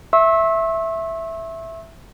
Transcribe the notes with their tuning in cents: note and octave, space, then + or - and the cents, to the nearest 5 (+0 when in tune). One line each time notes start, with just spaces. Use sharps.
E5 +0 C#6 -40 E6 -20